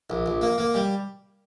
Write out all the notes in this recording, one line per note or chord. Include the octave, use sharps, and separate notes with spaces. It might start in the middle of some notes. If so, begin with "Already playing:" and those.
A#1
A#1
A#3
A#3
G3